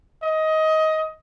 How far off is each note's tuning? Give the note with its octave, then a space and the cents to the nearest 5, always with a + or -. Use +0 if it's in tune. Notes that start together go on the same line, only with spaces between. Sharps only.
D#5 +20